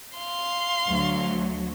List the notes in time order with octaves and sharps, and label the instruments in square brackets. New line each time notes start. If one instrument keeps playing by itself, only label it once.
[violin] F5 C6
[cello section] D2 F#3